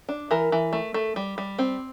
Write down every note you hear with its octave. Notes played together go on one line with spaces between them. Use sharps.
D4
E3 A#4
E3
A3
A3
G3
G3
C4